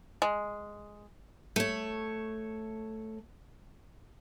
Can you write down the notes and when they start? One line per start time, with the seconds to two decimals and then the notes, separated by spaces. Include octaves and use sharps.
0.22 G#3
1.56 A3 C#5